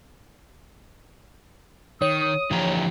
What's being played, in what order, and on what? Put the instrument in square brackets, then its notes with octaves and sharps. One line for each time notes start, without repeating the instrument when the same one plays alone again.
[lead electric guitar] D#3 [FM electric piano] C#5 [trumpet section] D#6
[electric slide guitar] D3 F3 A#5 [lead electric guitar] E3 G4